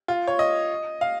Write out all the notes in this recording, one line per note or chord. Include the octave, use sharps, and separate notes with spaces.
F4
C#5
D#5
F5